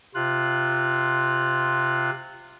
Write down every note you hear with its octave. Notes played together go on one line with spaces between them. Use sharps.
C3 F4 F#6